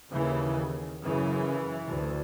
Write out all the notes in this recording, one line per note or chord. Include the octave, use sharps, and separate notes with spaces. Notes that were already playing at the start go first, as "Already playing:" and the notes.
D#2 C#3 E3
F#2 C#3 E3
D2